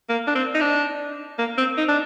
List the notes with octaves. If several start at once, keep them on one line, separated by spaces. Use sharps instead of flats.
A#3
D4
C4
D#4
D4
A#3
C4
D#4
D4